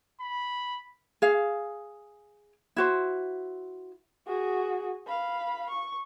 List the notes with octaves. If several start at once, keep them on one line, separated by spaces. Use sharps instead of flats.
B5
G#4 F5
E4 F#4 C5
F#4 G#4
F5 B5
C#6